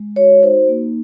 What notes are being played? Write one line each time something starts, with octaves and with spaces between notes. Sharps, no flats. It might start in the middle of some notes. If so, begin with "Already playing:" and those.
Already playing: G#3
F#4 C#5
D#4 C5
A#3